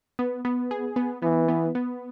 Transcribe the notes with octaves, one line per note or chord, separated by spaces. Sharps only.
B3
B3
G#4
B3
E3 B3
B3
B3